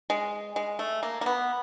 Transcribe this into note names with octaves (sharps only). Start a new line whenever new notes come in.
G#3
G#3
A3
A#3
A#3
B3